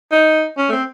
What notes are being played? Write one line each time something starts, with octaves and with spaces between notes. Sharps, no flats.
D#4
C#4
A3
C4